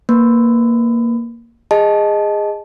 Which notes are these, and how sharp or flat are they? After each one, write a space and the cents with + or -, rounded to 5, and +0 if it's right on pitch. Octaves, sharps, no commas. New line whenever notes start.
A#3 +0 B4 +0 B5 +30
G#4 -20 D#5 +0 A5 -15